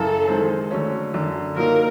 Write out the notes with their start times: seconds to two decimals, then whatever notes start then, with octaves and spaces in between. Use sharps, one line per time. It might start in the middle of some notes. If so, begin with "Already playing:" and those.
Already playing: F#2 C#3 E3 A4
0.27 D#3 G#3 C4
0.71 D3 F#3 A3 C#4
1.13 F#2 D3 F#3
1.56 A#2 F#3 A#3 D#4 A#4